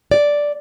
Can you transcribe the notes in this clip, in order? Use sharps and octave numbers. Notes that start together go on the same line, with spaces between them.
D5